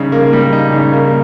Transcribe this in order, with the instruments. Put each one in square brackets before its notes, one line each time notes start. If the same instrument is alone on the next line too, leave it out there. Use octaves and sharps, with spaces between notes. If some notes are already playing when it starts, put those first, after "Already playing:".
Already playing: [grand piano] C#3 G3 D#4
A#3
G3
D#4
C#3
A#3